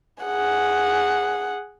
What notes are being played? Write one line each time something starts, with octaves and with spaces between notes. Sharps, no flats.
G#4 F#5